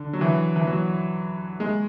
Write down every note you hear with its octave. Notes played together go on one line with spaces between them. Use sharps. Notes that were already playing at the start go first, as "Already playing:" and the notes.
Already playing: D3
F#3
E3
E3
F#3
G#3